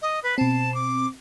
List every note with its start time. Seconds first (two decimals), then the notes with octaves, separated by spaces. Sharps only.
0.02 D#5
0.23 B4
0.38 B2 C4 A5
0.74 D6